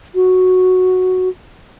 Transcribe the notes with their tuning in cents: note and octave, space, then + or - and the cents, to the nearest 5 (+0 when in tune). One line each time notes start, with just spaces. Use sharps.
F#4 -5